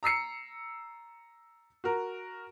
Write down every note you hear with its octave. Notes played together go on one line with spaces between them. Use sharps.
A#5 E6 C7 C#7
F#4 A#4